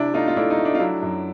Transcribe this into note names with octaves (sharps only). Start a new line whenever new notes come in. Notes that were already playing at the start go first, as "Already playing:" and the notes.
Already playing: C3 D4 E4
A3 D#4 F4
F4
A3 D4 E4
D#4
A3
D4
F4
F#3 D4 E4
F#2